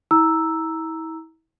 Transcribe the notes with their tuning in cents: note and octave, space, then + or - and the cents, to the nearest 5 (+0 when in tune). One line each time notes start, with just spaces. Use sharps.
E4 -35 A#5 +0 E6 +0